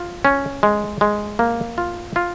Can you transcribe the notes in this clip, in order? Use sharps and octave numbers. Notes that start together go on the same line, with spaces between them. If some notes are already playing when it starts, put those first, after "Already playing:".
Already playing: F4
C#4
G#3
G#3
A#3
F4
F4